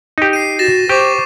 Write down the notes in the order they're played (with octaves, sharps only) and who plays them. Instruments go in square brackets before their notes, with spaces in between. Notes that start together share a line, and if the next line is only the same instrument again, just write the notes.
[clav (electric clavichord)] D#4 G4
[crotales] C7 D#7
[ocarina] F#4 [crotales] A6 A#6 E7
[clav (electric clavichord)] G4 [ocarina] C5 [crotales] C#6 D6 E7